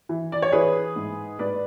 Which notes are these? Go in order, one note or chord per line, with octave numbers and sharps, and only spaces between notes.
E3
D5
C#5
E3 G#4 B4
G#2
G#2 B4 D5